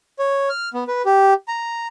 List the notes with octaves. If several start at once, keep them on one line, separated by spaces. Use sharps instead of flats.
C#5
F6
B3
B4
G4
A#5